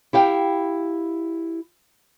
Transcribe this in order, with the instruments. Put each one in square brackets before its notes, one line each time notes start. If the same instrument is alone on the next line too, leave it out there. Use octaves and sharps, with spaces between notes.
[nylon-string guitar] E4 G4 F5 G5